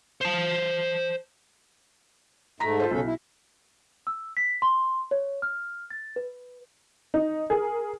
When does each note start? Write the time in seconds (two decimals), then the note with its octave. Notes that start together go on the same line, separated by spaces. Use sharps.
0.21 C5 A5
2.60 G#2 A3 A#5 A#6 B6
2.80 F4 A4 C5
2.91 B1 C#3 C#4 A4
3.04 E4
4.07 E6
4.37 B6
4.62 C6
5.11 C#5
5.42 F6
5.90 A6
6.16 B4
7.14 D#4
7.50 G#4 A#4